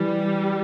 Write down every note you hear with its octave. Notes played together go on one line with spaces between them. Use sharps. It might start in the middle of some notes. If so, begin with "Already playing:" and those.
Already playing: E3 G3